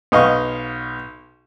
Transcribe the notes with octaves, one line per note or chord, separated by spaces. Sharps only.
B1 D#5 F5 C#6